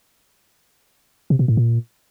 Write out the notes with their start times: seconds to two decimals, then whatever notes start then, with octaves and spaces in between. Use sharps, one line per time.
1.30 C3
1.39 B2
1.48 A2
1.57 A#2